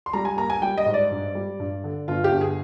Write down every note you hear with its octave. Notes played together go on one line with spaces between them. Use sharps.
C6
G3 A#5
G#5
A#3 A#5
G#5
G3 G5
D#5
G#2
D5
G2
G3
G2
D3
G1 F4
G4
G1
G#4